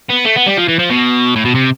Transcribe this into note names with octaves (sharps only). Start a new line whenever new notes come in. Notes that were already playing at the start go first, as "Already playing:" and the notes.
B3
A3
B3
G3
F3
E3
F3
B2
A2
B2
C3